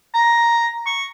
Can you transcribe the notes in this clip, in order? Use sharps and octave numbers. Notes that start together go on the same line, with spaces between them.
A#5
C#6